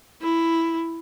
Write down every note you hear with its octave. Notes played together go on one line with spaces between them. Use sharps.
E4